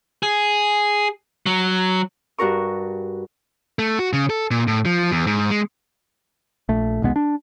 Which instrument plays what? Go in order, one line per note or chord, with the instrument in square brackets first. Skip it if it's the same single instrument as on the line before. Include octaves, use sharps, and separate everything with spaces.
[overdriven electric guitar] G#4
F#3
[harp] G2 F#4 A#4 C#6
[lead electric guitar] A3
F#4
C#3
A4
A#2
A2
F3
E2
G#2
G#3
[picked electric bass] A#1 A3
D#1 B1 G#3 B3
D4